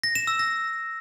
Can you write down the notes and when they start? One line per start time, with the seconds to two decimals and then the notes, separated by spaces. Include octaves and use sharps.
0.03 A#6
0.15 E7
0.27 E6
0.39 A#6